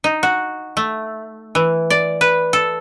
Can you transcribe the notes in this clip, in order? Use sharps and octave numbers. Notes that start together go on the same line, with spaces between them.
D#4
F#4
A3
E3
D5
B4
A4